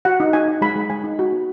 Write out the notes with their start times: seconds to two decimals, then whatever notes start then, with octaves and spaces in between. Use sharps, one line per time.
0.05 F#4 F#5
0.20 D#4
0.33 D#4 G#5
0.48 D#4
0.61 G#3 B5
0.76 G#3
0.90 G#3 G#5
1.04 D#4
1.19 F#4
1.32 B3